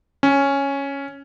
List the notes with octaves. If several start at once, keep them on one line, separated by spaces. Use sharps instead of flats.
C#4